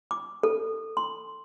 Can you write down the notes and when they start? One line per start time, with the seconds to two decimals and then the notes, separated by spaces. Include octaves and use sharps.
0.11 D6
0.43 A4
0.97 C6